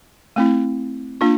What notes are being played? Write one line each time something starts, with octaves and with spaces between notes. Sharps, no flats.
A3 C4 E4
A#3 D4 F4